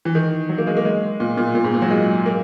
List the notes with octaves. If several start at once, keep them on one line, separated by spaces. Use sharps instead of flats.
E3
D#3
F#3
A#3
G#3
A#3
G#3
A#2
A#2
A#2
G#2
A#2
F#3
G#3
A#3